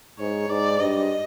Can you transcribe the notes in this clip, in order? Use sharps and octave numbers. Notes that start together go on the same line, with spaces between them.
G#2 C#5
G#2 D5
G2 D#5